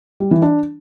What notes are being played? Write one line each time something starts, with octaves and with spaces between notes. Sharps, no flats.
G3
E3
D4